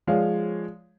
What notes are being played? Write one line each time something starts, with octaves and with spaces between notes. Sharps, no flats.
F3 G#3 C#5 D5 F5